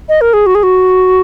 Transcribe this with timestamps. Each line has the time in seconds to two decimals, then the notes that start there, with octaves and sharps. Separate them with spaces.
0.09 D#5
0.21 A#4
0.33 G#4
0.46 F#4
0.55 G#4
0.63 F#4